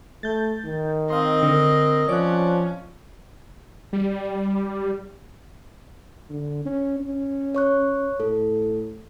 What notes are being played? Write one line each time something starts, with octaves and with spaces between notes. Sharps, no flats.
A3 G6 A6
D#3
C4 D#5 F5 C6
D3 A#4
F3 C#4 C#5 D5 F#6
G3
D3
C#4
C#4
C#5 C#6 F#6
A2 A4